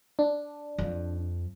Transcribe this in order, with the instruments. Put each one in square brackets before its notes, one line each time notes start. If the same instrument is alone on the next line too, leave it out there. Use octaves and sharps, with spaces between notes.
[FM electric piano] D4
[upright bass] F2